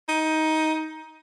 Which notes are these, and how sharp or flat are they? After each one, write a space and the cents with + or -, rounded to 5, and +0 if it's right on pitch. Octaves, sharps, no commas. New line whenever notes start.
D#4 +15